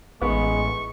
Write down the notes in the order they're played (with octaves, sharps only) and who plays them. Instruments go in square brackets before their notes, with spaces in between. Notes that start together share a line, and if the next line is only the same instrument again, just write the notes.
[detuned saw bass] A1 [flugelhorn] G#3 [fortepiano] B3 [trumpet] C#6